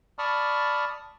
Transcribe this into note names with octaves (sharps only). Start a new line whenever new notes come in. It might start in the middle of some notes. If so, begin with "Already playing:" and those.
D5 A5 B5 C#6 D#6 F6